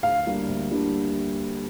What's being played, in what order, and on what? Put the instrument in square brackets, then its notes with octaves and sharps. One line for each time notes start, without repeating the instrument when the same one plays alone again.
[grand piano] D2 [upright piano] F5
[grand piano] D3 G3 A#3 D4
D2
D3 G3 A#3 D4